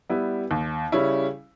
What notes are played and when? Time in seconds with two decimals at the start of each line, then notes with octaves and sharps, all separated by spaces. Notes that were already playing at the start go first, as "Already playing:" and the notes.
0.09 G3 B3 E4
0.51 D#2
0.92 C#3 G3 C#4 E4